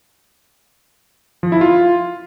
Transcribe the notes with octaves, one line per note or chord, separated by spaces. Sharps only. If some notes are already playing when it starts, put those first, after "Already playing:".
F3
E4
F4